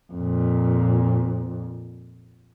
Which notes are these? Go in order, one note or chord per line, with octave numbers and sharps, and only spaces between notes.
F2 A#2